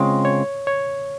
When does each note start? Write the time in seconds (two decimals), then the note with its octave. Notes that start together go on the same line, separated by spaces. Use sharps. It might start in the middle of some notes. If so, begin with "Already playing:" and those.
Already playing: C#3 G#3 C4 F4 C#5
0.25 C#5
0.67 C#5